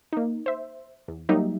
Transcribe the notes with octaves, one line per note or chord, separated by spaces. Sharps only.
A#3 D#4
C5 E5
E2
F#3 G3 A#3 D#4 G4 E5